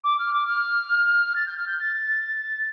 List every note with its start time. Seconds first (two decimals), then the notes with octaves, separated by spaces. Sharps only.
0.04 D6
0.19 F6
0.33 D6
0.47 F6
1.35 A6
1.46 G6
1.57 F6
1.67 G6
1.79 A6